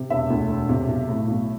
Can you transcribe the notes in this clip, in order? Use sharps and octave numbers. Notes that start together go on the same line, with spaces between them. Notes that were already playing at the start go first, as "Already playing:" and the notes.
Already playing: C3
E1 E5
D2
E1
C3
B1
A2
B1